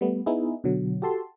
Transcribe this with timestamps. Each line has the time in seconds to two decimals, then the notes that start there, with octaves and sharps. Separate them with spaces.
0.01 G3 A3 B3
0.26 B3 D#4 E4 G#4
0.64 B2 D3 F#3
1.02 F#4 G4 A4 A5 C6